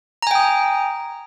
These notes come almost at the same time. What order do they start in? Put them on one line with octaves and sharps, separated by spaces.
A#5 G#5 G5 D#6